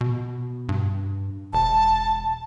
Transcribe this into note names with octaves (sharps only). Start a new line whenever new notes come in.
B2
G2
E1 A5